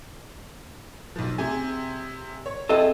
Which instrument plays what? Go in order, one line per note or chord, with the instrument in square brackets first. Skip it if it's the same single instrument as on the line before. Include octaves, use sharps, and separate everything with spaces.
[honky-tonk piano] B1 F3
C3 G#4 G#5
C#5
[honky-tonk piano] C4 E4 G#4 [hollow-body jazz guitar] A4 D#5